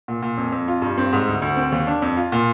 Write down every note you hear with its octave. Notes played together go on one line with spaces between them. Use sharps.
A#2
A#2
F2
F2
F4
G2
C4
G#2
D2
D2
C4
D#2
D4
F2
F4
A#2